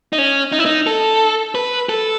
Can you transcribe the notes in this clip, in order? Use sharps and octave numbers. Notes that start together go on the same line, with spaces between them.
D#4
C#4
D#4
E4
D#4
A4
B4
A4